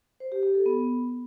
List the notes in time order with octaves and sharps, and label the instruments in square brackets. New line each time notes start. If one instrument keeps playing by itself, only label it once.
[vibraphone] C5
G4
G4
A4
B3